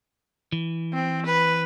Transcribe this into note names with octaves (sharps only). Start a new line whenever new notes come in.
E3
C4
B4